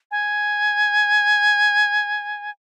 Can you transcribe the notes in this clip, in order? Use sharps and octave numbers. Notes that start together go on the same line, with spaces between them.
G#5